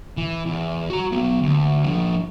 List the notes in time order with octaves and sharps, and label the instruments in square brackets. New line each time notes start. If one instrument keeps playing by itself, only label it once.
[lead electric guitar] E3
E2
F#4 A#5
F#3 B3
D2
F3 D4